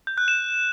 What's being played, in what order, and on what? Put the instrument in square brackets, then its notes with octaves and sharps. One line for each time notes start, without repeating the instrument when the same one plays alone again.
[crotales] G6
F#6
E7